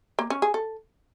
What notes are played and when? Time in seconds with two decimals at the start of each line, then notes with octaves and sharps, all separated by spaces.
0.19 A#3
0.30 C#4
0.42 G#4
0.54 A4